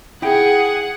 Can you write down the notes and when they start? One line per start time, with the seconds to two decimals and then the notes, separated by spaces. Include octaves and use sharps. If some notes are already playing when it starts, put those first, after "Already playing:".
0.22 E4 G#4 F#5 G5